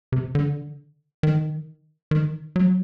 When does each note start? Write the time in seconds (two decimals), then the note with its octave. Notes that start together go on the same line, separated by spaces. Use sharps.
0.12 C3
0.35 D3
1.23 D#3
2.11 D#3
2.56 F#3